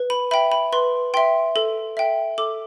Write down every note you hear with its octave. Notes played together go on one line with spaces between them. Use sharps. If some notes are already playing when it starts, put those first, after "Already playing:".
Already playing: B4
B5
E5 G5 B5
B5
B4 C6
E5 G5 C6
A4
E5 G5
A4 D6